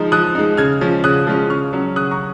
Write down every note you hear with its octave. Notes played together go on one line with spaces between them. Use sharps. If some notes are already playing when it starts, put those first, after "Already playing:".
Already playing: F3 G#3 D#4
F3 D#6 F#6
G#3 D#4
C#3 F6 G#6
F3 G#3 C#4
C#3 D#6 F#6
F3 G#3 C#4
C#3 C#6 F6
F#3 C#4
C#3 D#6 F#6
A#5 C#6